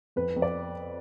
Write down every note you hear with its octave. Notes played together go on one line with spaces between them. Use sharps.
F2 B4
F2
D5